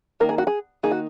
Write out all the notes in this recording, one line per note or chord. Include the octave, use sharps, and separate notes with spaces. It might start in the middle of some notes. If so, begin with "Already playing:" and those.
D#3 A#3 D#4 A#4
G#4
F#4
G#4
D#3 A#3 D#4 G#4
F#4